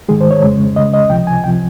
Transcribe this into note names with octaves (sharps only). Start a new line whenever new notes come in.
G#2 D#3 G#3 G#4
C5
C#5
F2 C#3 G#3
C#2 C#3 G#3 D#5
D#5
C#2 C3 F3 G5
G#5
C#2 C3 F3 G5